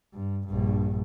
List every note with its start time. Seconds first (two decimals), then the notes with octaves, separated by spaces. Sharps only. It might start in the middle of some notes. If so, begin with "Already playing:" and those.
0.14 G2
0.47 A#1 G2